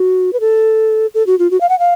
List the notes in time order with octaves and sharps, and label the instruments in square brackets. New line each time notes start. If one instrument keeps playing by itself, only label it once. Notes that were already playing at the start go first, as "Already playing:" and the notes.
Already playing: [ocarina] F#4
B4
A4
A4
F#4
F4
F#4
F5
F#5
F5